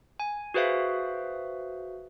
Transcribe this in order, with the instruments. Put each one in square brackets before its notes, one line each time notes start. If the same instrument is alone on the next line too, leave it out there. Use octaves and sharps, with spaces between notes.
[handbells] G#5
F#4 G#4 B4 C5 E5 F5